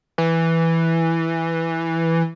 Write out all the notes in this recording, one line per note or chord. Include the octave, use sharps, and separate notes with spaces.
E3